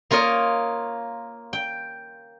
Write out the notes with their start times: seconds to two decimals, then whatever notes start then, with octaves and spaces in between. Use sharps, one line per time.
0.11 A#3 F4 A#4 C#5 D#5
1.53 G5